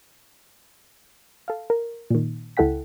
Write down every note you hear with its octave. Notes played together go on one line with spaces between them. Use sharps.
A4 F5
A#4
A#2 D#3
C#2 E4 A4 F#5 G5 B6